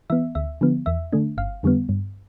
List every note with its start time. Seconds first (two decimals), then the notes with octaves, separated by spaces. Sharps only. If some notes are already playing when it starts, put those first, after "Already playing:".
0.10 E3 B3 E5
0.35 D2 E5
0.61 D3 F3 B3
0.86 E2 E5
1.12 D3 A3 D4
1.37 G1 F5
1.63 F2 D3 G3 B3
1.89 G2